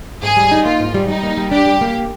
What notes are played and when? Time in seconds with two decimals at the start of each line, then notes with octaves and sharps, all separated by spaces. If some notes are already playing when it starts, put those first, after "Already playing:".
0.23 G#2 G#4
0.37 G3
0.52 D#4
0.65 A#3 F4
0.80 G#2
0.94 G3
1.08 G3 D#4
1.23 A#3
1.37 G3
1.52 D4 G4
1.66 G3
1.81 A#3